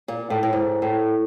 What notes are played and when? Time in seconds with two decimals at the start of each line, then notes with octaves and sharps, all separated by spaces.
0.08 A#2
0.30 A2
0.43 A2
0.53 G#2
0.82 A2